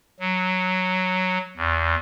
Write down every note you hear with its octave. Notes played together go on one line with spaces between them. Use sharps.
F#3
E2